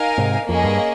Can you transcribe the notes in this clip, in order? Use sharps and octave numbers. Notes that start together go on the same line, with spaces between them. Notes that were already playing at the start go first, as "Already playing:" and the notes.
Already playing: D#4 A#4 F5 G#5
G#2 C3
F2 A#3 C#4 G#4 D#5
G2